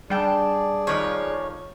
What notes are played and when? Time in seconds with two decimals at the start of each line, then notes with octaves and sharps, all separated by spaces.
0.10 G3 D4 G#4 D5 G5 A5
0.87 F2 D#3 F3 C#5